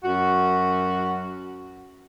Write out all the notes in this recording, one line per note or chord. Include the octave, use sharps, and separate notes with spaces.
F#2 F#4